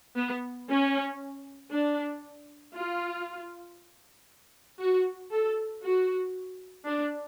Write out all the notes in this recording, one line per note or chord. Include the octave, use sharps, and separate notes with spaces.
B3
C#4
D4
F4
F#4
A4
F#4
D4